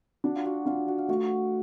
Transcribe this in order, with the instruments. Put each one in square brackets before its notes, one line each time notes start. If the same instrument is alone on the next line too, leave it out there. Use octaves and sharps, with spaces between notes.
[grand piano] D4 [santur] F#4
[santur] F4
F#4
[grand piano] D4 [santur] F4
[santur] F#4
F4
[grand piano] A3 [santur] F#4